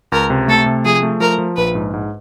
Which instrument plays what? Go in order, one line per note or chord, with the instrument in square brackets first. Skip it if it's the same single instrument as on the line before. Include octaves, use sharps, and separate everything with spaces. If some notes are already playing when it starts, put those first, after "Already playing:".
[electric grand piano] C#2 [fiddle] A#4
[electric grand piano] C3
[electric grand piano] A3 [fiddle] A4
[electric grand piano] C3
[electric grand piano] F3 [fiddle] G#4
[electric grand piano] A3
[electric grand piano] F3 [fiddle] A#4
[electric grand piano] F3
[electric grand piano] A#1 [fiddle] B4
[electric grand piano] G#2
G#2